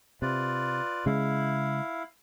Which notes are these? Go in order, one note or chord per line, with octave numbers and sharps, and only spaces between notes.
C3 F4 B4 D5
C#3 G#3 E4 F5